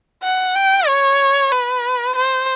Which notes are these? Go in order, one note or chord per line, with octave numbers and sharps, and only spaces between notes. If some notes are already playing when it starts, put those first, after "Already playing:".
F#5
G5
C#5
B4
C5